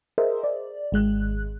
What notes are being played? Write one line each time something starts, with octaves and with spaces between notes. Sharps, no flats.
G#4 A#4 C5 D#5 E5
D5
G#1 G#3 F#6